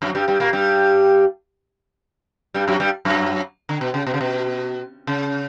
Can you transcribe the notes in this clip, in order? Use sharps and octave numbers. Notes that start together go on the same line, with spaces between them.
F#2 F#3
G2 G3
G2 G3
A#2 A#3
G2 G3
G2 G3
F#2 F#3
G2 G3
F#2 F#3
D3
B2
C#3
B2
C#3
B2
C#3